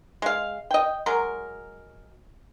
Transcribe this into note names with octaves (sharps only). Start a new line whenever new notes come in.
G#3 F5
D#5 G5
F#3 G#3 A#4